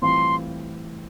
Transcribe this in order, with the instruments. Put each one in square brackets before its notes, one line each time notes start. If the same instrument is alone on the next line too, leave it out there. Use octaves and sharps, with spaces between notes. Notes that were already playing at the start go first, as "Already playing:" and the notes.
[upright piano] A2 E3 G3 C4 F4 [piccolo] C6